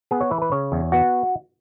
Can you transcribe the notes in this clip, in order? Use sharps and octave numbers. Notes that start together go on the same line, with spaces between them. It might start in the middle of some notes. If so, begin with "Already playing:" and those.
B3 G#4
C#5
E3 B4
B4
C#3 C#5
E2
B3 F#4